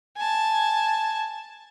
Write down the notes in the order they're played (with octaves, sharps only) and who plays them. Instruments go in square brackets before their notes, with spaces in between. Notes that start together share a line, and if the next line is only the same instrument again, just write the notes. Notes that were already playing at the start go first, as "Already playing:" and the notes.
[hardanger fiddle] G#5 A5